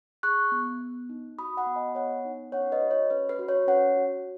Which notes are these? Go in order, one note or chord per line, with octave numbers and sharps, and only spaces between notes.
G#4 C#6 F#6
B3
B3
D#4
F#4 B5 D#6
F#5 B5
B3
D#5 G#5
B3 C#5 F#5
D#4
C#4 C#5 F#5
B4 D#5
F#4
C#5
C#4 B4
B4
F#4
C#5
C#4 C#5 F#5
F#4